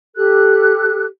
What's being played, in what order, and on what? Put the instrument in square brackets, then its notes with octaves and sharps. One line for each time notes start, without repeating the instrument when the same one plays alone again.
[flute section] G4 A4 F#6